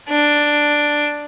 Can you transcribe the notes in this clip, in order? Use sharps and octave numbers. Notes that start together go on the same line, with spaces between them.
D4